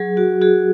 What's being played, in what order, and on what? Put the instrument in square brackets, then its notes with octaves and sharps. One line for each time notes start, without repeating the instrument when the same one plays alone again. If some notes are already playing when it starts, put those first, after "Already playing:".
Already playing: [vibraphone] F#3 G#4
F#4
F#4 G#4